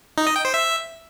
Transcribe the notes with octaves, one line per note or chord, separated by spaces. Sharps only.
D#4
D#5
G5
C5
E5